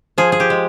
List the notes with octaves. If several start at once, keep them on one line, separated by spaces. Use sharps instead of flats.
F3 G#4
G#4
G4
G#3